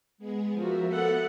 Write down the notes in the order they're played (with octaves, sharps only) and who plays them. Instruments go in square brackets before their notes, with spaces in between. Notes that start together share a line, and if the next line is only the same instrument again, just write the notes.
[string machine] G#3 B3 G#4
[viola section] F3 F#4 [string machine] A#4 E5
[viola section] B3 A4 F#5 [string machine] E5